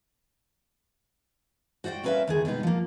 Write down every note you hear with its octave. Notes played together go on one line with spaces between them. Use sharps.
F#4 C5 D5 E5 G5
G3 A#3 C#4 B4 C5 E5
D#2 D3 G#4
B2 G3 G#3 B3 D#4 B4
F3 A#3